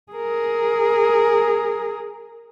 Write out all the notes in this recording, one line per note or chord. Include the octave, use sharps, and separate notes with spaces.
G#4 A#4